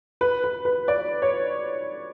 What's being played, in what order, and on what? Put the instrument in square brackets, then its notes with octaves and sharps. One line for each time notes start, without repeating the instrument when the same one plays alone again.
[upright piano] B4
B4
B4
D5
C#5